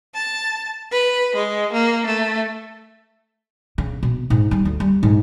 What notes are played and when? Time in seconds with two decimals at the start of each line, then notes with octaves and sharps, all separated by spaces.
0.14 A5
0.91 B4
1.35 G#3
1.73 A#3
2.06 A3
3.78 C#3
4.03 B2
4.30 G#2
4.51 G3
4.65 D2
4.80 G3
5.03 G#2